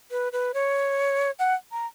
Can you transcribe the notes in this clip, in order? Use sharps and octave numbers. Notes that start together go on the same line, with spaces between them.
B4
B4
C#5
F#5
A#5